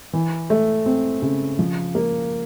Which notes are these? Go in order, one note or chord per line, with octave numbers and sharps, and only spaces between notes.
E3
A3
C4
C#3
F3
A#3